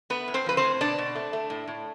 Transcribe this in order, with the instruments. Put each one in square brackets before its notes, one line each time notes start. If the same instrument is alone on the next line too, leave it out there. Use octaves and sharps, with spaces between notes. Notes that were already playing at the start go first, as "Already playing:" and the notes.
[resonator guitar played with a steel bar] A3 B3 B4
A2
C4 C5
F3 B4
C4 C5
A2
B2 D4 D5
B2
A3
A3
A2
A2